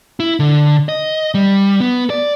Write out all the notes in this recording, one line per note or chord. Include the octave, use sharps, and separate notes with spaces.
E4
D3
D#5
G3
B3
D5